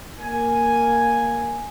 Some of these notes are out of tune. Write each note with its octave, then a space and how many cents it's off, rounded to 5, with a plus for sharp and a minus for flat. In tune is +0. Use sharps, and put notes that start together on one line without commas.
A#3 +0 G#5 +0